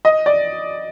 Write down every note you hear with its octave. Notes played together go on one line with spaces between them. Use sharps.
D#5
D5